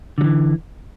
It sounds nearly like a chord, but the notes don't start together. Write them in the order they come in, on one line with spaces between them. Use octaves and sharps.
D3 F#3 E3